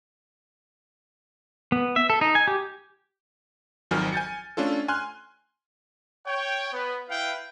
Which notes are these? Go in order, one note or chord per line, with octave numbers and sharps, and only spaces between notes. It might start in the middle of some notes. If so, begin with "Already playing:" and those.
B3
E5
A4
D#4
G#5
G4
G#1 F2 D#3 F#3 G#5 F6
G#5 G6 A6 C#7
A3 C#4 D4 F4 A4
G#5 C6 F6 F#6
C#5 G5
B3
E4 B4 F5 G5